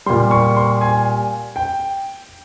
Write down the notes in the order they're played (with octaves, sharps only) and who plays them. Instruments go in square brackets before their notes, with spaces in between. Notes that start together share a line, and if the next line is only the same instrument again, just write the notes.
[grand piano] A#2 G3 C6
C#6
C6
G#5
G5